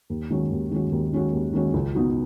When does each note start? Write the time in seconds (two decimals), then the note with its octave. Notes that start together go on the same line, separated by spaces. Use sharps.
0.10 D#2
0.30 D#3 G#3 C#4 F#4
0.51 D#2
0.71 D#3 G#3 C#4 F#4
0.92 D#2
1.13 D#3 G#3 C#4 F#4
1.33 D#2
1.53 D#3 G#3 C#4 F#4
1.74 C#2
1.95 B2 B3 D#4 F#4